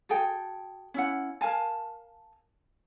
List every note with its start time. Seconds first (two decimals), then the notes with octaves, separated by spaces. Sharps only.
0.09 F#4 G#4 A4 G5
0.94 C#4 E4 F#5
1.41 A#4 F5 G#5 A5